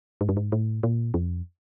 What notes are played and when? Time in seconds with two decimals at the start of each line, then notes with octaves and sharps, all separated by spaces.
0.21 G#2
0.29 G2
0.37 G#2
0.52 A2
0.83 A#2
1.14 F2